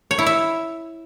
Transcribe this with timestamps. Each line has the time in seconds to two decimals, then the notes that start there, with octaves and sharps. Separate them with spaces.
0.11 C#5
0.19 E4
0.26 E5